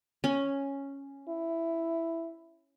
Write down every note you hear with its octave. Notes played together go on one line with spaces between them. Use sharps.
C#4
E4